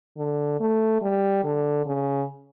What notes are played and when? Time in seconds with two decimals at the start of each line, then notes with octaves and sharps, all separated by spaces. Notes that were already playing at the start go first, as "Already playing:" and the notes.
0.17 D3
0.60 A3
1.02 G3
1.44 D3
1.86 C#3